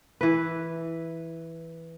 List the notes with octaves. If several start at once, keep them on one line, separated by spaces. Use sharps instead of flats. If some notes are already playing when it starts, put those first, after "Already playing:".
E3 B4